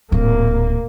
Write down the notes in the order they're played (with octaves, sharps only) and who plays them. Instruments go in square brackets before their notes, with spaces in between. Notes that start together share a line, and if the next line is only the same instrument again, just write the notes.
[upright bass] D1 [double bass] A#2 A#3